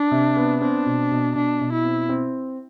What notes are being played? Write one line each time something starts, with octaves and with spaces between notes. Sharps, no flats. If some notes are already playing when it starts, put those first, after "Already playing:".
Already playing: D4
C3
B3
C4 D4
B2
B2
B2 D4
B2
E4
C4
C4